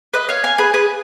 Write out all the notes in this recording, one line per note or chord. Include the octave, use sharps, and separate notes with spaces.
B4 D#5
C#5 F5
F5 G#5
G#4 B4
G#4 B4